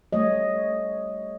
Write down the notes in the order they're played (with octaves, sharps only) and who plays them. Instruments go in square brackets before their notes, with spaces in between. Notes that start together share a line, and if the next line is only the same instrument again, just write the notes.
[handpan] G3 A3 C#5 D#5